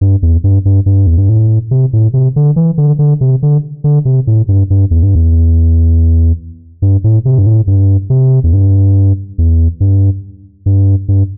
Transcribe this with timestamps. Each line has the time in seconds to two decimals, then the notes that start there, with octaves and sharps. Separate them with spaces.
0.01 G2
0.22 E2
0.44 G2
0.65 G2
0.86 G2
1.07 E2
1.17 G2
1.29 A2
1.71 C3
1.93 A2
2.14 C3
2.36 D3
2.56 E3
2.78 D3
2.99 D3
3.21 C3
3.43 D3
3.84 D3
4.05 C3
4.27 A2
4.48 G2
4.70 G2
4.91 E2
5.03 G2
5.15 E2
6.82 G2
7.04 A2
7.25 C3
7.38 G2
7.46 A2
7.67 G2
8.10 C3
8.44 E2
8.53 G2
9.38 E2
9.80 G2
10.66 G2
11.08 G2